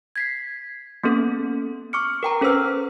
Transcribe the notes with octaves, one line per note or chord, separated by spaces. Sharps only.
G#6 B6 C7
A#3 B3 C#4 A4
C#6 D6 F6 C#7
A#4 G5 A#5
C#4 A4 B4 C5 E6 F6